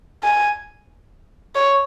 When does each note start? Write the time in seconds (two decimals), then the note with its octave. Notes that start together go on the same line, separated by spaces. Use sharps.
0.23 G#5
1.55 C#5